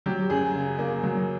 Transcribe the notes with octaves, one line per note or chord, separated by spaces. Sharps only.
F#3 G4
F#2 G#4
C#3
A#3
F#3